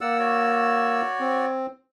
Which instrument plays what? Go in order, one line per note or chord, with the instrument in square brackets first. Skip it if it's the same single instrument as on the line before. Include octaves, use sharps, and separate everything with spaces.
[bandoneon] A#3 E6 [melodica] D5 F#5
[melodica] F#4 C#5 D5
[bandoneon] C4